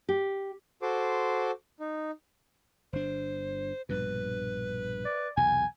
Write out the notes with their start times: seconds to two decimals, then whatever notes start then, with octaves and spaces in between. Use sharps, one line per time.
0.09 G4
0.82 F#4 A4 C5 C6 D6
1.80 D#4
2.93 G1 D4 C5
3.89 A#1 G2 B2 B4
5.05 D5
5.37 B1 E2 C3 G#5